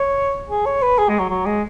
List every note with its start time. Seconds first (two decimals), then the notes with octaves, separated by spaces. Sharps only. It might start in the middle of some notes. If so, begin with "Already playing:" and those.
Already playing: C#5
0.50 G#4
0.66 C#5
0.82 B4
0.98 G#4
1.09 G#3
1.19 F#3
1.30 F#3
1.46 G#3